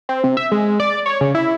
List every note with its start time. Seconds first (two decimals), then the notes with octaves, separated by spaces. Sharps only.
0.09 C4
0.24 C3
0.37 E5
0.52 G#3
0.80 D5
1.06 C#5
1.21 C#3
1.35 E4